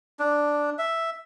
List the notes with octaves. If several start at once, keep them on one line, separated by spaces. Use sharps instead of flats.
D4
E5